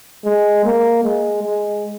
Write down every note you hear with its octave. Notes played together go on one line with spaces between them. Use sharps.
G#3
A#3
G#3
G#3